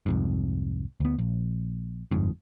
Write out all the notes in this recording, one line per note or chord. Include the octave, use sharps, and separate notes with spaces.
C2 F2 G#2
D2 B3
A#1
G1 F2 G#2